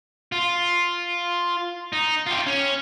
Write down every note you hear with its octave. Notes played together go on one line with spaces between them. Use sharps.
F4
D#4
F4 G4
C#4